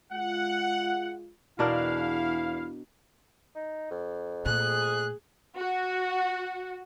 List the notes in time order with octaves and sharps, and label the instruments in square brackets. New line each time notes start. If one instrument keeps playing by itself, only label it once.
[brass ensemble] G#3 F4 [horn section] F#5
[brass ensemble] E2 [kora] B2 D4 A#4 [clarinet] E4 [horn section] F5
[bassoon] D#4
F2
[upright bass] A#2 A3 [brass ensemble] G#4 [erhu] F#6
[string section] F#4